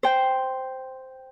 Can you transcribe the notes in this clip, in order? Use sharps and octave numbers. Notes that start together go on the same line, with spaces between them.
C5 G5